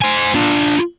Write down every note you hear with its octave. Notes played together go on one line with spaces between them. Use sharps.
C5 G#5
D4 F4